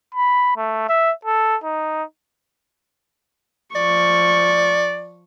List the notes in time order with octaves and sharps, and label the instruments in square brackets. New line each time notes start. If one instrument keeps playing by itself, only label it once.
[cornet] B5
A3
E5
A4
D#4
[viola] F3 C#6 [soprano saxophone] D5